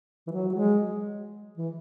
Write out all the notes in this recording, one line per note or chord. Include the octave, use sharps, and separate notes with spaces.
E3
F#3
F#3
G#3
E3